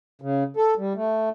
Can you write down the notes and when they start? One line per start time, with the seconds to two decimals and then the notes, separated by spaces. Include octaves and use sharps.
0.22 C#3
0.57 A4
0.78 G3
0.95 A3